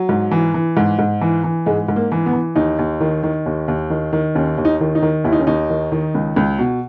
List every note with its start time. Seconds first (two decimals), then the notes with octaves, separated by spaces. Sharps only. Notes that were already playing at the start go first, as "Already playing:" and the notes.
Already playing: F#3
0.09 G#2
0.31 E3
0.54 E3
0.77 G#2
0.99 G#2
1.21 E3
1.44 E3
1.66 G#2 G#3
1.88 G#2
1.96 A#3
2.12 E3
2.26 B3
2.33 E3
2.56 D#2 D#4
2.79 D#2
3.01 D#3
3.23 D#3
3.46 D#2
3.68 D#2
3.90 D#3
4.13 D#3
4.35 D#2 C#4
4.58 D#2
4.65 D#4
4.81 D#3
4.95 D#4
5.02 D#3
5.24 D#2 E4
5.32 D#4
5.39 C#4
5.47 D#2 D#4
5.70 D#3
5.92 D#3
6.15 C#2
6.36 C#2
6.59 B2